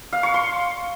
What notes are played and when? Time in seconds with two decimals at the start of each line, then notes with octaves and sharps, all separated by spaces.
0.13 F5
0.23 C#6
0.34 C6